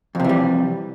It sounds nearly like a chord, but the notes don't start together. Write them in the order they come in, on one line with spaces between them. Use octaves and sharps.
F2 C3 E3 G3